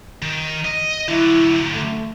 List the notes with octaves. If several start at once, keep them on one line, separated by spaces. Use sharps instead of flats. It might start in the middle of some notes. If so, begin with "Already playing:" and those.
D#3
D#5
D3 F#3 E4
A3